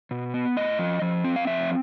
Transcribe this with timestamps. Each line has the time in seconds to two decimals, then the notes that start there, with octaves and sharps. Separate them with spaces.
0.11 B2
0.34 B3
0.57 A2 D#5
0.79 F3
1.02 F3
1.24 C4
1.36 F5
1.47 F3 E5